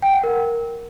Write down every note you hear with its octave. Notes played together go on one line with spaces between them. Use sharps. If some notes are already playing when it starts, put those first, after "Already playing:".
G5
F#5
A#4